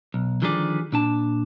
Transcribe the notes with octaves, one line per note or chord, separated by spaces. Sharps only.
B1
D3 D#3 F3 G3 G#4 D5
A#2 D4 A5